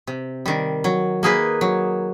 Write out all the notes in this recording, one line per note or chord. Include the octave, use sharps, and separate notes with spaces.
C3
D#3 G3
F#3
A#3 D#4 G#4 B4
F#3